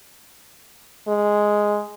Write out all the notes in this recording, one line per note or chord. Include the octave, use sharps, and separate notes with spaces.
G#3